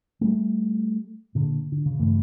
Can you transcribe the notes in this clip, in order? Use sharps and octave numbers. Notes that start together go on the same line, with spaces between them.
G3 A3
A#2 D3
D3
C#3
G2 C#3 E3 A3